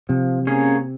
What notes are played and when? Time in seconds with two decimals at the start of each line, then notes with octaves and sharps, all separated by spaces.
0.09 C3 F3
0.47 A#3 C#4 G#4